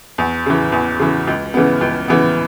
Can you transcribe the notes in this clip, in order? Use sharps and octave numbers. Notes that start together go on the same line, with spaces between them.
E2
C#3 E3
E2
C#3 E3
C#2
C#3 E3 B3
C#2
C#3 E3 B3